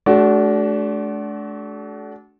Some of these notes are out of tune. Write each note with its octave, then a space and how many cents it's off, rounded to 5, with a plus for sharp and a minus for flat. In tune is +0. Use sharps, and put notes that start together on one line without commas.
A3 -40 D4 -25 F#4 +20